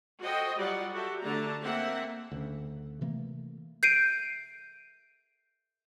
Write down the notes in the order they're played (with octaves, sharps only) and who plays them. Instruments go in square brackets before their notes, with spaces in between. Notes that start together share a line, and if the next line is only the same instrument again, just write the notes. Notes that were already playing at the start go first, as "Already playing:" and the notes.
[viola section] F#4 A4 C5 D#5 G5
F#3 G3 F4 D5 F#5
F#4 G4 A4 E5
D3 A3 A5 A#5
A#3 C4 E5 F#5
[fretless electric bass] D2 C#3
C3 E3 A3 A#3
[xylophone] G6 C7 D7 D#7